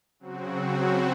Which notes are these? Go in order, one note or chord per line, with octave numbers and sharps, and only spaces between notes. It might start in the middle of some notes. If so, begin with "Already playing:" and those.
C#3 F#3 C4 F#4